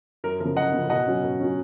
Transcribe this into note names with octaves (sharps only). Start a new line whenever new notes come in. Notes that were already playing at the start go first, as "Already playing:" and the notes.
F#2 A#4
C#3 F3 A#4
F#2 D#5 F#5
C#3 F3
B2 D#5 F#5
F#3 C#4
B2
F#3 C#4